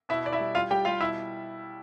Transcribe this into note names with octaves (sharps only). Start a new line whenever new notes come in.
B2 E4 E5
B2 D5
E4 E5
G3
G3 F4 F5
G3 G4 G5
G3 F4 F5
B2 E4 E5